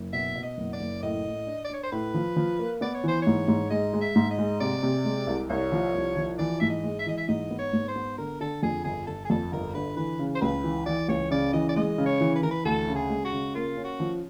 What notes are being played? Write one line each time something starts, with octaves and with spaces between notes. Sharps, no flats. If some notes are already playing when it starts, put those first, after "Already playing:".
Already playing: F#1
B2 E5
B2
D#5
F#1
D5
F#1
A2 D#5
A2
D4
D5
D4 C#5
C5
A2 B4
F3
F3
A#3
B3 D5
C#5
E3 C5
G#2 C#5
G#2
G#3 D#5
G#3
E5
G#2
D#5
G#3
C3 D5
C3
G#3
C2
C2 C#5
F3
C2
F3
E3 D5
G#2 E5
D#5
G#3
E5
E3 D#5
E5
G#2 D#5
B3
C#5
G#2
C5
B3
D3 A#4
D3 A4
F2 G#4
G1 G#4
G1 A4
G#4
F2 A4
G1 A#4
D3 B4
E3 B4
C#3
C5
C#2 B4
E3
E3 D5
C#2 C#5
C#3 D5
E3 D#5
D5
G#3 D#5
C#3
C#5
E3
B4
E3 A#4
B4
D2 A4
C#3
G#4
G#3
F#4
C#3
A#3 F4
C#4
F#4
F3